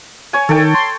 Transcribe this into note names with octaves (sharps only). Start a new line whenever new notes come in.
C#5 G#5
D#3 A4 G5
C6